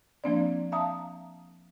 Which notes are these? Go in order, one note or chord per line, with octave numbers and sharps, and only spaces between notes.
F3 A#3 C4 D4 D5
E5 F5 A5 A#5 D#6